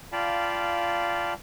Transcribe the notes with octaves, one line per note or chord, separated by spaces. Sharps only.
F4 D5 F5 G5 A5 B5